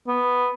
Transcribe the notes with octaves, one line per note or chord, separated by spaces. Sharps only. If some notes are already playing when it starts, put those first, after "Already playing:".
B3